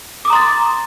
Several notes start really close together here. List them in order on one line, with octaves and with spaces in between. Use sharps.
D6 D#6 A#5 C6 A6